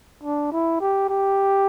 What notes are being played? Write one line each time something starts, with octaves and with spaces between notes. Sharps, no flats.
D4
E4
G4
G4